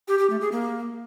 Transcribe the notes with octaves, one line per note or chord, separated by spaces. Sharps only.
G4
G4
A3
G#4
A#3